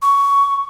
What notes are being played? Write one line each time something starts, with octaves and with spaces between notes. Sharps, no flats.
C#6